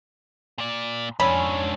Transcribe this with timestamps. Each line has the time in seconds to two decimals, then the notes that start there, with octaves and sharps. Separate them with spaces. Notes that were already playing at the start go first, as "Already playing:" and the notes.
0.58 A#2 D5
1.20 F2 G#2 C#4 D4 C#5 B5 E6